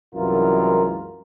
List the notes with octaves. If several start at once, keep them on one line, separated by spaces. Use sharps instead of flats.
C2 F#2 E3 G#3 F4 A#4